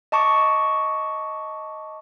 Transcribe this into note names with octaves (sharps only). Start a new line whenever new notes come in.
D#5 A5 C#6 D6